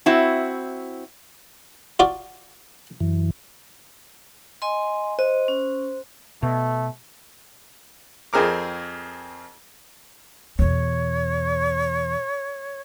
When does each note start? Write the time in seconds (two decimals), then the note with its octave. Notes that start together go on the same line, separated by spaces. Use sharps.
0.06 C4 E4 F#4
1.99 F4 F#4 D5
3.00 F#2 E3
4.62 D#5 G#5 C6
5.19 C5 D#5
5.48 C#4
6.43 B2 A3
8.33 F2 C4 G#4 A#4 D6
10.59 E2 B2 C#5